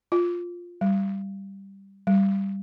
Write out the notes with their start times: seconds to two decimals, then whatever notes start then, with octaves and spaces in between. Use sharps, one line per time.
0.12 F4
0.81 G3
2.07 G3